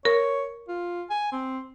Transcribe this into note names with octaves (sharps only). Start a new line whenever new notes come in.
A#4 C#5
F4
G#5
C4